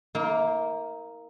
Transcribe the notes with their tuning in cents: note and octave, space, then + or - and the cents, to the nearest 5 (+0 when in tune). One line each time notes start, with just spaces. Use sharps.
A#3 +0 E4 -45